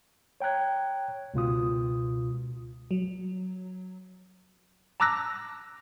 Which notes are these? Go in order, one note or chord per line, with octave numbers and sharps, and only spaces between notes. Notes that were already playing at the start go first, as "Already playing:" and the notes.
C#5 G5 A#5 F#6 G#6
C#2 B2 F4 D#6
F#3
A5 A#5 D6 E6 F#6 A#6